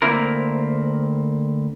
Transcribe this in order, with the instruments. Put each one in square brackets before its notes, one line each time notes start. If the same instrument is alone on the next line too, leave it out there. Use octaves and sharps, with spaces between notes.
[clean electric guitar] D2 A#3 C4 E4 A#4